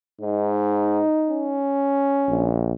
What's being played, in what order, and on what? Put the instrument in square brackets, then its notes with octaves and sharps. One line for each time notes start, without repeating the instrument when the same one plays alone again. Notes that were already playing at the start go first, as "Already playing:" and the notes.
[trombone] G#2 [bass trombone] D#4
[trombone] C#4
[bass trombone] A#1